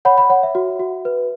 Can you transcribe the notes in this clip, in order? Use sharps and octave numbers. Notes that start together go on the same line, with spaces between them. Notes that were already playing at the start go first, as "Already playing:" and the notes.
C#5 F#5 B5
F#5 B5
C#5 F#5
E5
F#4
F#4
B4